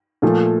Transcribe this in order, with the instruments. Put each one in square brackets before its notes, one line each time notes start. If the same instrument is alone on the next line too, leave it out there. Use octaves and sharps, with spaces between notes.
[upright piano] A#2 F3 A3